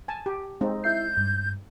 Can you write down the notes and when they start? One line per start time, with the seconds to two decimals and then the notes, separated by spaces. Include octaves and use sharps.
0.08 G#5 A5
0.26 G4
0.61 G#3 C4 D#4
0.84 E4 E5 G6 C7
1.17 G2